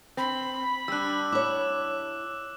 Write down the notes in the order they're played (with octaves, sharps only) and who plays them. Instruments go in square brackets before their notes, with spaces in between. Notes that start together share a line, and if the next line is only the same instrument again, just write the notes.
[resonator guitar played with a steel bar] C4 [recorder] B5
[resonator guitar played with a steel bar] G3 D4 [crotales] E6 F#6
[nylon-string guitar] E4 C#5 [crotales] D6